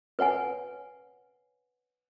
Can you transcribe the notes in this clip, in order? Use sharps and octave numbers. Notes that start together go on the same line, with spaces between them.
B4 C#5 F#5 G#5